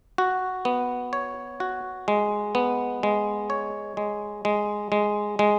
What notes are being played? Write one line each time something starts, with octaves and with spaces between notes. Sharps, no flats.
F#4
B3
C#5
F#4
G#3
B3
G#3
C#5
G#3
G#3
G#3
G#3